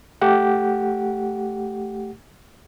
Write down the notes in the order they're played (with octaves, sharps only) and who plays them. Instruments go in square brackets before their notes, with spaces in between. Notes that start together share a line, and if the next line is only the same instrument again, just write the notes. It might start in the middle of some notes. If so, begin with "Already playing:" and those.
[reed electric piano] A3 G4 F#5